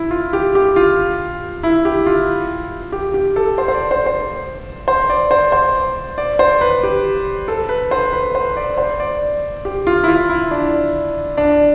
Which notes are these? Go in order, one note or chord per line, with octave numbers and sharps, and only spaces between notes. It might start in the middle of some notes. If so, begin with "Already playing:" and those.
Already playing: E4
F4
G4
G4
F4
E4
G4
F4
G4
G4
A4
C5
C5
D5
C5
C5
C5
D5
C5
C5
D5
C5
B4
G4
A4
B4
C5
B4
C5
D5
C5
D5
G4
F4
E4
F4
E4
D4
D4